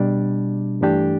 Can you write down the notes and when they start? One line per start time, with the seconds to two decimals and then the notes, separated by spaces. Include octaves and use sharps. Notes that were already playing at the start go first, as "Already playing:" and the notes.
Already playing: B2 G3 D4
0.81 G2 E3 A3 D4 G4